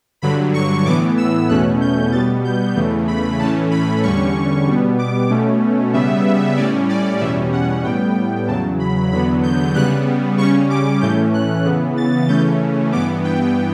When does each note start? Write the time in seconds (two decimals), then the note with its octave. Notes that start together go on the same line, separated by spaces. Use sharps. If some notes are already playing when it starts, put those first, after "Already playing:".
0.22 G2 D3 F#3 B5
0.54 C#6
0.86 A2 E3 B3 D6
1.17 E6
1.49 E2 B2 A3 C#4 F#6
1.81 G6
2.12 B2 G3 B3 A6
2.44 G6
2.76 E2 C#3 E3 A3
3.08 B5
3.39 A2 E3 A3 C#4 A5
3.71 B5
4.03 E2 D3 G3 C#4 C#6
4.67 B2 G3 B3
4.98 D6
5.30 B2 A3 C#4
5.93 C#3 G3 B3 E5
6.57 A2 G3 C#4 D5
6.89 D5
7.20 E2 B2 G3 C#4 E5
7.53 F#5
7.84 A2 G3 B3 G5
8.48 E2 C#3 F#3 A5
8.79 B5
9.11 E2 D3 F#3 B3 B5
9.43 G6
9.75 C#3 G3 B3 F#6
10.38 C#3 G3 C#4 C#6
10.70 D6
11.01 A2 E3 A3 C#4 G6
11.34 F#6
11.65 C#3 E3 B3
11.97 A6
12.29 C#3 E3 A3 C#4 G6
12.92 G2 E3 B3 D6
13.24 G5